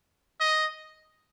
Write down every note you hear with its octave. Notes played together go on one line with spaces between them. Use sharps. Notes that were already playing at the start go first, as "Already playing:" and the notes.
D#5